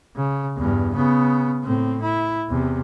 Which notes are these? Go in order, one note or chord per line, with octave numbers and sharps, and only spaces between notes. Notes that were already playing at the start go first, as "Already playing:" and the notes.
C#3
E2 G2
C#3 B3
A2 C4
E4
E2 C3